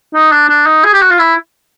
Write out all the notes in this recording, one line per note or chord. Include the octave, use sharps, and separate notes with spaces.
D#4
D4
D4
D#4
G#4
G4
F#4
F4
E4